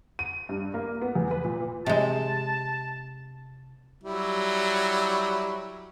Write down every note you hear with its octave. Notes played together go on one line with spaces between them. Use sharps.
D#7
G2
A#3
B3
E2
B4
A#2
C3 G#3 A5
F#3 G3 E4